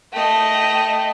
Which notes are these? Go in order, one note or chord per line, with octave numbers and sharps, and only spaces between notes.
A3 D#5 G5